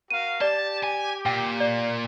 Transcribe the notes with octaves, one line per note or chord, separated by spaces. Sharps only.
F#4 A#4 F5 D#7
G4 D5 A5
G#5
A#2 G5
D5